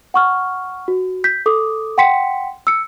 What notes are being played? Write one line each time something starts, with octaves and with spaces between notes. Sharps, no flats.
F#5 C#6 F6
F#4
G6 B6
A4 D6 D#6
F#5 G5 C6 B6 C#7
E6 C#7